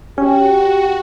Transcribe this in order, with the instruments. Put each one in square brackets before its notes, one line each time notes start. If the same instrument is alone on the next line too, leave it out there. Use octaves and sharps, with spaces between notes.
[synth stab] C#4 [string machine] F#4 [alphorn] G4 [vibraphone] G5